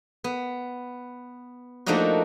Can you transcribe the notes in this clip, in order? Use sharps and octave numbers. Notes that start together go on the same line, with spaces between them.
B3
F3 A3 A#3 D4 D#4 F#4